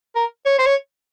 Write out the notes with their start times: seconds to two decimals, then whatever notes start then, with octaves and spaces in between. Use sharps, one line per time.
0.16 A#4
0.46 C#5
0.59 C5
0.66 C#5